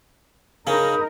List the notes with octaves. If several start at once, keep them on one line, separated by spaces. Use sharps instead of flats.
C#3 C#4 D#4 A#4 B5 D#6 G6